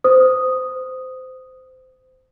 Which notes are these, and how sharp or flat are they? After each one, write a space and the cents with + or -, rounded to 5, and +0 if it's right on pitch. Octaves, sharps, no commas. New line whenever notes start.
C5 -20 D#6 +0